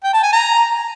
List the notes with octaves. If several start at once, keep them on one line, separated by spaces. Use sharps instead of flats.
G5
A5
G#5
A#5